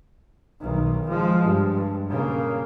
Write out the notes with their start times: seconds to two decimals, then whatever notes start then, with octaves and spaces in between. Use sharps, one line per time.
0.61 B1 D#3
1.08 F3 G#3
1.44 G2
2.09 C#3 A#3